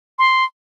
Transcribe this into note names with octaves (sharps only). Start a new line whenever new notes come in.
C6